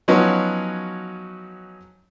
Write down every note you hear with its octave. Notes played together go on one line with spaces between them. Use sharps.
F3 F#3 B3 C#4 D#4 F#4